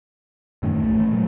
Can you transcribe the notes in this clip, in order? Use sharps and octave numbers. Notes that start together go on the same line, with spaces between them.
F#2 A2 D#3
A#1 A3
E3 A3
A#2 F#3 A3